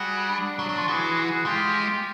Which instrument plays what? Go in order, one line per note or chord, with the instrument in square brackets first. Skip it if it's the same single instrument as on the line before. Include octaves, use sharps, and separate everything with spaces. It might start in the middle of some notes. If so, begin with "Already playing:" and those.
Already playing: [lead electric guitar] G3 [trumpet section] F#4 G#4
[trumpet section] D4
[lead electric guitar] F#3
F#3
F3
[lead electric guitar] E3 [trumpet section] F#4 G#4
[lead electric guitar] G#3 [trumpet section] F4 G4